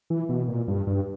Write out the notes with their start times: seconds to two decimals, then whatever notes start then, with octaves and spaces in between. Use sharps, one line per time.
0.10 E3
0.29 B2
0.48 A#2
0.68 G2
0.87 G2